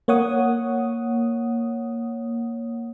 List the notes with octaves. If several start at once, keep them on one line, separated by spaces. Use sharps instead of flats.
A#3 C#5 F#5 D#6